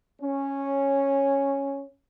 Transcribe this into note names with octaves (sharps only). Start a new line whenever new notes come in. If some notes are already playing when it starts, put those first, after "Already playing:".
C#4